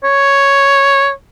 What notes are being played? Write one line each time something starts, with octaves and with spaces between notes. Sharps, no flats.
C#5